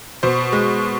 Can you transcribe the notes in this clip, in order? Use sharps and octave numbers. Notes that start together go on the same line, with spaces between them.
B2 C5
G#3